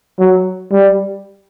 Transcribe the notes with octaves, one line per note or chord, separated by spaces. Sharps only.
F#3
G3